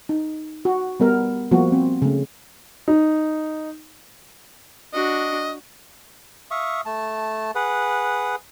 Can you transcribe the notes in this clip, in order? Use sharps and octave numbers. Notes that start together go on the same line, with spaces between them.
D#4
F#4
G3 B3 A#4
F3 G3 A#3 B3 F#4
C4
C#3 A3
D#4
D4 F#4 D#5
E5 F5 C#6 D#6
A3 A5
G#4 B4 F#5